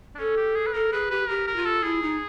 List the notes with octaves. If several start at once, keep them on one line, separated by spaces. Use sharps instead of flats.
D4
C#4 A4
G4
G#4
B4
A4 A#4
G#4 B4
G4 B4
G4 A#4
A#4
F4
A4
E4 G#4
D#4